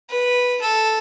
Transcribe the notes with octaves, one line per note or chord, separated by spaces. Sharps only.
B4
A4